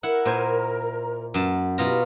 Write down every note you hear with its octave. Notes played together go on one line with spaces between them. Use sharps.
E4 A#4 F#5 A#5
A#2 C5 G#5
F#2 A5
B2 E4 F4 G4 A#5